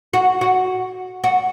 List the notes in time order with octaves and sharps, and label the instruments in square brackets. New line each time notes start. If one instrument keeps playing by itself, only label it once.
[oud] F#4
F#4
F#4